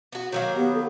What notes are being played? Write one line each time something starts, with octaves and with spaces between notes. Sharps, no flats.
B3 F#4
D#3 F#3 A#3 C#5
B3 G4
A4